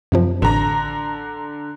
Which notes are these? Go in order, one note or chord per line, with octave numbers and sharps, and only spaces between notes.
F#2 C3 F3
A1 D3 A#5